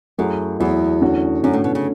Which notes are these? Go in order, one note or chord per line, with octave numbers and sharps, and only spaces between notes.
F#2 F#3 A3 E4 G#4
E2 F#3 A3 E4 G#4
D3 A3 C#4 F#4
F#2 D3 A3 C#4 F#4
A2
B2
C#3